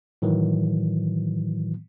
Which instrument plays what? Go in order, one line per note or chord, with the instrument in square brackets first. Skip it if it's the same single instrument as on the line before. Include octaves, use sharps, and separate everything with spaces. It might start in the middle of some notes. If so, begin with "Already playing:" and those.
[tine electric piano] A2 D#3 E3 F#3